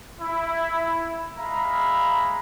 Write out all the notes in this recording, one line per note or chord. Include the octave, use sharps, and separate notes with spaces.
E4
G#3 E5 F5 A#5 B5